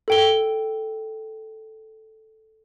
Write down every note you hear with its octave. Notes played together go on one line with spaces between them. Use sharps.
A4 G5 G7